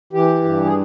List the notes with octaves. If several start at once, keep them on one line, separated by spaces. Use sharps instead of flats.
E3 G4
G2
G#4